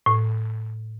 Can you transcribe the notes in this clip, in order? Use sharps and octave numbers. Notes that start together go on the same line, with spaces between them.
A2